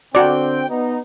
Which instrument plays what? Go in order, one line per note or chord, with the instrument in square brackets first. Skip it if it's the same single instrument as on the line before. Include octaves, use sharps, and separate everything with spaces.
[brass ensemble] D3 C4 G5 [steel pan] F#4 D5
[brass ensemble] B3 D#4